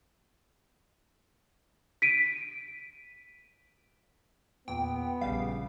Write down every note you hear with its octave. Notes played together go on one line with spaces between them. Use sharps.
B6 D7 D#7
E2 A#2 B3 G5
A#1 C#3 G3 F5